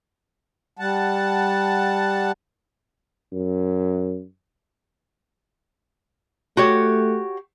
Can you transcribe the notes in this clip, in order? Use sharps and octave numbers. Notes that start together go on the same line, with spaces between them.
G3 F#5 A5
F#2
A3 F#4 G4 C#5